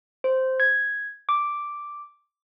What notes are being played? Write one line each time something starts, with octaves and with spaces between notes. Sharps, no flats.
C5
G#6
D6